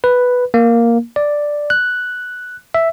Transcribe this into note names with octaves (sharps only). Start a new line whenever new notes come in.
B4
A#3
D5
F#6
E5